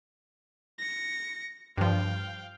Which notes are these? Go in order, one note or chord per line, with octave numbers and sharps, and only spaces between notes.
A#6 C#7
G2 F3 F5 G5